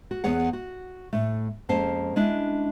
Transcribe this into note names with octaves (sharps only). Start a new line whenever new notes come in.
F#4
E2 B3 G#4 C#5 F#5
F#4
A2 A3
F2 G#3 A#3 C#4 C5 A5
G#3 C#4 D4 E4